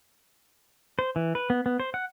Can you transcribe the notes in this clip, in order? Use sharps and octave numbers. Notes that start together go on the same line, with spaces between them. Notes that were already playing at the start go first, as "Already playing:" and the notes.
C5
E3
B4
B3
B3
C5
F#5